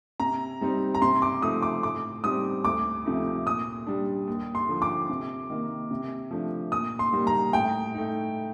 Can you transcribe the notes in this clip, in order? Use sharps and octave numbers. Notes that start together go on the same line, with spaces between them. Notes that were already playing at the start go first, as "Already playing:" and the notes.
C3 A#5
G3 C4 D#4
A#5
C3 C6
D6
F3 A3 D#4 D#6
D6
A2 D6
G3 C4 D#4 D#6
D2 D6
C3 F3 A3 D#4
A#2 D#6
G3 D4
D#2
C6
D3 F3
D6
C3
D#3 A#3
C3
F3 A3 D4
A#2 D#6
C6
G3 A#3 D#4
A#5
A2 G5
A3 D#4